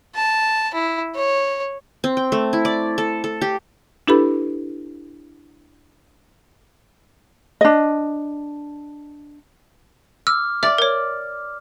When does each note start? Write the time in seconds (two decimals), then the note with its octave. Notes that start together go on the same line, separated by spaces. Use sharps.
0.15 A5
0.74 E4
1.16 C#5
2.04 C4
2.17 G5
2.32 A3
2.53 E4
2.65 D5
2.98 A4
3.24 A4
3.41 G4
4.07 D4 E4 G4 A4 B4 B5
7.61 D4 D#5
10.27 D6 E6 F6
10.63 D5 E5
10.78 A#4 C#5